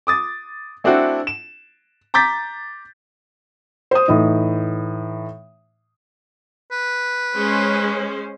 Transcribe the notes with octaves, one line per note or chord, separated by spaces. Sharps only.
D6 D#6 A6
A3 C4 D4 E4 F#4
E7
A#5 D6 G6 A6 B6
C5 D#6
A2 E3 D#4
B4
G#3 C#4 C5